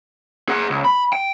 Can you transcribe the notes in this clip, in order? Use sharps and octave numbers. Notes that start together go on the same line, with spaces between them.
G#4 F#5
C#2
B5
G5